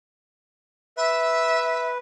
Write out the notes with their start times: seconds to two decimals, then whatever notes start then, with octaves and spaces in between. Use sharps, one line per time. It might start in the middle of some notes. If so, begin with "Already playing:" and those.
0.97 B4 E5